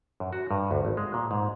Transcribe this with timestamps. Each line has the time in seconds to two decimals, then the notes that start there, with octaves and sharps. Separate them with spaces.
0.20 F#2
0.33 F#4
0.51 G2
0.71 D2
0.85 G#1
0.97 G#3
1.14 A#2
1.31 G#2